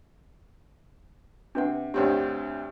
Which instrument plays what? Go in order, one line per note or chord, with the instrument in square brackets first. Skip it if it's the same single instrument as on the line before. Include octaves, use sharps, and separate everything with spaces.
[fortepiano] C3 [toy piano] D4 B4 F#5
[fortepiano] D2 G2 C4 [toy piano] G4 C#5 F#5